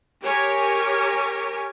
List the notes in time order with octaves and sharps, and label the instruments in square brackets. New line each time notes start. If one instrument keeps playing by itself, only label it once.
[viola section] G4 A#4 C#5 G#5